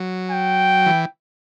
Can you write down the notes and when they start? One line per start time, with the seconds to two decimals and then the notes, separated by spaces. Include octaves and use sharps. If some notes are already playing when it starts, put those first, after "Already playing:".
Already playing: F#3
0.31 G5
0.86 E3